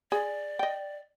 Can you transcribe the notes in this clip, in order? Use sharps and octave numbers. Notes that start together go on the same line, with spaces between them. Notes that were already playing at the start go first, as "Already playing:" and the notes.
G#4 D5
D#5 G5